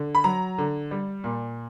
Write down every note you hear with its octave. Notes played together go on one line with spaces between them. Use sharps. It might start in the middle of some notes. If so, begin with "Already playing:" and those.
Already playing: D3
B5
F#3 A#5
D3
G3
A#2